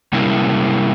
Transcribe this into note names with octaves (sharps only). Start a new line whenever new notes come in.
C3 G3 G#3 A#3 C#4 E4